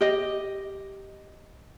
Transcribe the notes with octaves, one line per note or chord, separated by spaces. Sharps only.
G4 D#5